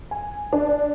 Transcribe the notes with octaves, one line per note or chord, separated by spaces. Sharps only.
G#5
D4